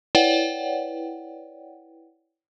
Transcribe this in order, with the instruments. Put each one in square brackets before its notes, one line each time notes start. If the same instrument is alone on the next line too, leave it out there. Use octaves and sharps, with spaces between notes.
[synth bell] E4 B4 C#5 D5 F#5 G5